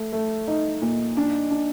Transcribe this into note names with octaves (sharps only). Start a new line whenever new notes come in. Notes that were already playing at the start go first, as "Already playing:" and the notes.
Already playing: A3
A3
D#4
A#2
D4
D4